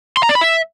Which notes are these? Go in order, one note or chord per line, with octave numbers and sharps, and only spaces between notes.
C6
A#5
D5
B5
E5